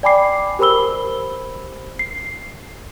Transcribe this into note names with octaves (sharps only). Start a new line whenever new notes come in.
D5 G5 G#5 B5 D6 C7
G4 A#4 C5 B5 E6 G7
C7